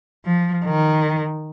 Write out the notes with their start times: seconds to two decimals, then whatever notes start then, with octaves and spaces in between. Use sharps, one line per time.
0.25 F3
0.65 D#3